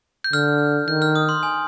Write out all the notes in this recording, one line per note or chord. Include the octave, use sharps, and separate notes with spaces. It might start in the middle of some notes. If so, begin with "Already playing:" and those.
G6
D3 F6
D#3 G6
F6
D#6
C6
G#5